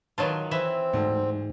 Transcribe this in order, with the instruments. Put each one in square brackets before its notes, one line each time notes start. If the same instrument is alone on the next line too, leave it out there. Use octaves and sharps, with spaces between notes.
[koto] D#3 F#3 F4 [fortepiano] B4 C#5 A5
[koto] E3 E5 [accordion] C4
[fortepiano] D2 [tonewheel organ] G#2